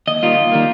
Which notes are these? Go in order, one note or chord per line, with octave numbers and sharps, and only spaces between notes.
D#2 D#5
D#3 G3 A#3 F4
D#2
D#3 G3 A#3